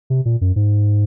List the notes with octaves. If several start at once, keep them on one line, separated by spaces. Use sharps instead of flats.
C3
A#2
F#2
G#2